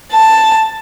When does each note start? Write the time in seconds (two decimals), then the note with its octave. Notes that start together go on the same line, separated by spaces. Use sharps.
0.12 A5